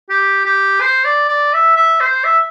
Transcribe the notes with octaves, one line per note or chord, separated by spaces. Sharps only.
G4
G4
C5
D5
D5
E5
E5
C5
E5